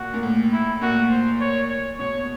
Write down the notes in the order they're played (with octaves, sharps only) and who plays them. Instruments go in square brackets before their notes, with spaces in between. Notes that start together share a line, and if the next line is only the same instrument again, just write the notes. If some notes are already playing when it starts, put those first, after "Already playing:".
Already playing: [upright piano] A#2 [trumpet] F#4
[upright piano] A#2
A2
[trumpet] E4
[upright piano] A#2 [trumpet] F#4
[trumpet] C5
C#5
C#5
[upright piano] B2 [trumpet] C#5